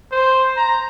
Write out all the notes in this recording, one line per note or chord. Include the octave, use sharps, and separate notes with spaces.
C5
A#5